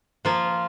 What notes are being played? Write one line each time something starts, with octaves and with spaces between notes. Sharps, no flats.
F3 A#3 F4